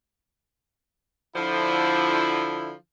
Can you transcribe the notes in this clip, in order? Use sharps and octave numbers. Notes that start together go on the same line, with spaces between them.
D3 F3 E4